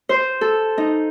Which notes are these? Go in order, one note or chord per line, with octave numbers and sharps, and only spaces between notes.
C5
A4
D#4